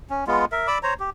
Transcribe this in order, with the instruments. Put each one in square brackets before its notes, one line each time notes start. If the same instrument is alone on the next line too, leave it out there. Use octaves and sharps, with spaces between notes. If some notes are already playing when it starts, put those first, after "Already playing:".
[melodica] C#4
G#3 B3 F4
A#4 E5
D5 B5 D6 E6
C5 C#5 A#5
G4